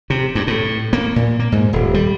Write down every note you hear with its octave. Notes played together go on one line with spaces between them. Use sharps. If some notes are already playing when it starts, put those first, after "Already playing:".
C3
G2
A2
A#3
A#2
A#3
G#2
D#1
G3